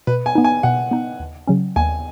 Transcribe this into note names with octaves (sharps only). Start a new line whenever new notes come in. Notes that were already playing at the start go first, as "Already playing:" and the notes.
B2 B4
G#5
B3 D#4
G#5
B2 F#5
B3 D#4
D#2
C#3 F#3 C#4
D#2 G#5